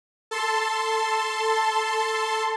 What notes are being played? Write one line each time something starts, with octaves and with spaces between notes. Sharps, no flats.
A4 A5 C6